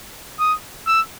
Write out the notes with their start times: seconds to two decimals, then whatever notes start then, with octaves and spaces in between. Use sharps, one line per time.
0.39 D#6
0.87 E6